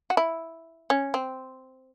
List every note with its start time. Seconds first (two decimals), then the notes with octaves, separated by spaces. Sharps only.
0.10 F#4
0.17 E4
0.90 C#4
1.14 C4